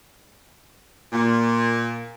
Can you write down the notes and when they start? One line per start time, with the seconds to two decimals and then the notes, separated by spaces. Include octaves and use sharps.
1.12 A#2